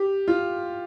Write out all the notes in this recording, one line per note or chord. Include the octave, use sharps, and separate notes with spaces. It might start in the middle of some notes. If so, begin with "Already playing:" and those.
Already playing: G4
F4